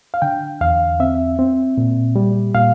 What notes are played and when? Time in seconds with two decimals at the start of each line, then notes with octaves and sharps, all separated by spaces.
0.14 F5
0.22 D3 G5
0.61 E2 F5
1.00 C4 E5
1.39 C4
1.78 A#2
2.16 G3
2.55 A#2 F5